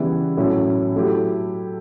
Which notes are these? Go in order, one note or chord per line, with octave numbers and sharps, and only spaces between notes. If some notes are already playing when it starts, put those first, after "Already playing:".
Already playing: C#3 E3 G3 B3 E4
A2 F#3 C#4 E4
F#3 A3 E4 G4